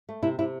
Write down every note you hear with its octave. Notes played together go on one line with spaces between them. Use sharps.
A3
C3 E4
C3 E4